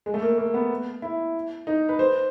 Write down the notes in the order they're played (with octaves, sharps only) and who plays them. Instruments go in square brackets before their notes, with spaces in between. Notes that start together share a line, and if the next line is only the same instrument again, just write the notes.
[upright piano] G#3
A3
A#3
A#3
B3
E4
D#4
B4
C5